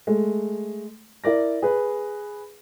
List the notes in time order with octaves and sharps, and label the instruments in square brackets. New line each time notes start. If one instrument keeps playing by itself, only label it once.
[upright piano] G#3 A3
E4 A#4 D5 A#6
G#4 B4